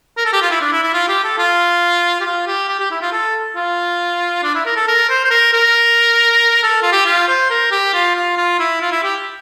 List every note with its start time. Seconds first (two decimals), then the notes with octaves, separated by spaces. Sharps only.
0.17 A#4
0.25 A4
0.33 G4
0.42 F4
0.51 E4
0.61 D4
0.72 E4
0.83 E4
0.94 F4
1.08 G4
1.24 A4
1.38 F4
2.20 G4
2.25 F4
2.47 G4
2.69 G4
2.79 G4
2.91 E4
3.02 F4
3.12 A4
3.56 F4
4.43 D4
4.55 E4
4.66 A#4
4.76 A4
4.88 A#4
5.10 C5
5.25 C5
5.31 A#4
5.53 A#4
6.63 A4
6.82 F4
6.92 G4
7.06 F4
7.28 C5
7.50 A#4
7.71 G4
7.93 F4
8.15 F4
8.37 F4
8.59 E4
8.81 F4
8.92 E4
9.04 G4